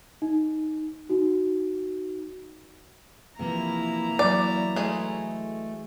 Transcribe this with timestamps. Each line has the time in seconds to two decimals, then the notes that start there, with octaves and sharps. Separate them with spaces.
0.22 D#4
1.09 D#4 F#4
3.39 C3 E3 F3 A#3 E4 A#5
4.19 E3 F#3 D5
4.76 G#3 A3 G#5